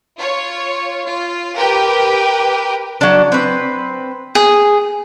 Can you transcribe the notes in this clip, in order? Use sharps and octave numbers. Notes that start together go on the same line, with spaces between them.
F4 C#5
F4
G4 A#4 B4 G5
F#3 D4
C4 B4
G#4